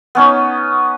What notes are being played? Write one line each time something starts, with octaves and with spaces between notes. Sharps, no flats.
B3 C#4 D#4